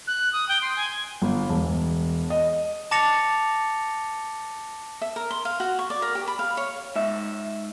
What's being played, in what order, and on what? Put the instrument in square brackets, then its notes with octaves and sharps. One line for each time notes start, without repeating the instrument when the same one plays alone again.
[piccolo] F#6
D#6
G5
C6
G#5
[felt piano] G1
E1
D#5
[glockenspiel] A5 D6 A6 A#6 C#7 F7
[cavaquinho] E5
A#4
C6
F5
F#4
C#6
D5
A#4
G4
B5
F5
C#5
[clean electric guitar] G#2 E5